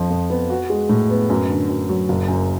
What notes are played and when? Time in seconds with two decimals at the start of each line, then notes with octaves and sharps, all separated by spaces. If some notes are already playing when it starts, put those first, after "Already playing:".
Already playing: F2 F3
0.10 F2
0.30 B3
0.50 F#4
0.70 G#3
0.89 A2
1.10 B3
1.30 F#2
1.49 D3
1.70 F#2
1.89 F#3
2.09 F#1
2.28 F#2